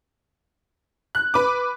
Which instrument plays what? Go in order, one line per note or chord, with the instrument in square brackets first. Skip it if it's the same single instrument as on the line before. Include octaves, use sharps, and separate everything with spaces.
[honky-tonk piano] F#6
B4 D6